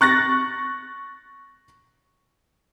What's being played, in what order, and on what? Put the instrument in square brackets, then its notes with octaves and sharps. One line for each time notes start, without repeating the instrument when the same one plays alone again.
[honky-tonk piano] C#6 F#6 A6 A#6